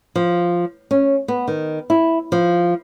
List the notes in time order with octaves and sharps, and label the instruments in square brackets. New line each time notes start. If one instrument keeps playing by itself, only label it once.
[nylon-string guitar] F3
C#4
B3
D#3
E4
F3